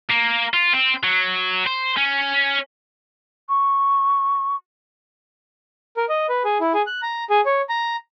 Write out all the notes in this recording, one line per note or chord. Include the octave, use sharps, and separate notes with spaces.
A#3
F4
C4
F#3
C5
C#4
C#6
A#4
D#5
B4
G#4
E4
G#4
F#6
A#5
G#4
C#5
A#5